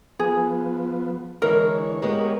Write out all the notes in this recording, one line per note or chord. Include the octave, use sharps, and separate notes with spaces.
F3 B3 G#4
D3 E3 G#3 A#4 C#5
G#3 B3 G4 A#4 B4 C#5